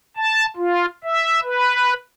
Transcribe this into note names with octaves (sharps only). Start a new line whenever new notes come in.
A5
F4
E5
B4